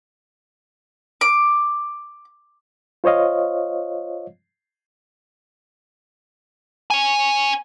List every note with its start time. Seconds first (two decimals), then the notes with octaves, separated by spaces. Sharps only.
1.21 D6
3.04 F4 C5 C#5 D#5 F5
6.90 C#5 G#5